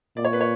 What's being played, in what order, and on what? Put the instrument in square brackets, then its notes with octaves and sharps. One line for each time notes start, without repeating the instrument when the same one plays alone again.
[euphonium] A#2 [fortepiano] D5
[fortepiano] C#5
B4
C#5